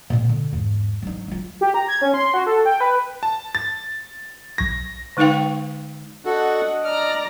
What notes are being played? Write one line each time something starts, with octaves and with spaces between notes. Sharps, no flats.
A#2 C4
D3
E2 G#2
F#3 D#4
F#3 F4
G4
A#5
G#6
C#4
C6
F#4
A4
G5
B4
A5
A6
B1 C#6 G#6 A#6
D3 G#3 D#4 B4 F5 G5
D4 F#4 A4 D#5 F#5
D5 A#5 F6